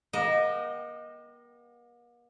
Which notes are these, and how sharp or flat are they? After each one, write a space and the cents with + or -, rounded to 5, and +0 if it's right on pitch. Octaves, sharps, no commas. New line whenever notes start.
A#3 +45 D#5 +0 G5 -40